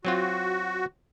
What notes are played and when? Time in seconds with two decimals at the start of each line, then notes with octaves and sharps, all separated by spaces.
0.05 F#3 C4 F4 F#4